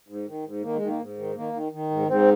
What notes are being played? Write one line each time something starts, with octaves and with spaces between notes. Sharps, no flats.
G#2
D#3
G#2
D#3 A#3
G#3
D#3
A#3
G#2
D#3
D#3 A#3
D#3
D#3
G#2
G#2 C4